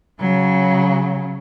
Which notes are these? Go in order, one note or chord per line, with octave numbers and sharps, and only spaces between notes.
C#3 F#3